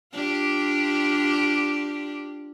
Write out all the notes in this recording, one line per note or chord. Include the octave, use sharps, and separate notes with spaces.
D4 F4 G4